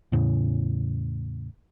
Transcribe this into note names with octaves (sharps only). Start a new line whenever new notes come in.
E2 A2 C#3